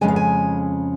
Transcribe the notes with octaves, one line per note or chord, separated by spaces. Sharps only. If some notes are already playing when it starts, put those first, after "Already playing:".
F2 C#3 G#3 C#4 G#5
F5
G#5